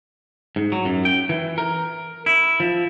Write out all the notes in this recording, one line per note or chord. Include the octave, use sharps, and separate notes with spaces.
G#2
F#3
F#2
G5
E3
A#4
E4
F3